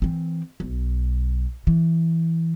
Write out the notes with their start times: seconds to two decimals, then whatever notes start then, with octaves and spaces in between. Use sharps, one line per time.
0.02 E3 C4
0.60 B1
1.67 E3